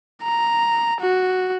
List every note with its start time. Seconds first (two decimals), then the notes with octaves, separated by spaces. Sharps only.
0.23 A#5
1.00 F#4